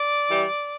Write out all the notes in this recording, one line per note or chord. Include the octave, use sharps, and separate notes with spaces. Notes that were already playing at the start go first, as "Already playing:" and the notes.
Already playing: D5
E3 G3